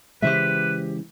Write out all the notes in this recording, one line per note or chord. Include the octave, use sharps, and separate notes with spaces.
C#3 E3 G#3 G4 B4 C5 E5